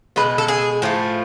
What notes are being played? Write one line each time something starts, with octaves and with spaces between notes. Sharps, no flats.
B2 G#3 B4
A4
G#4
A2 F3 A3